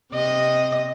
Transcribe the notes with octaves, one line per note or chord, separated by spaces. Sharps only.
C3 D#5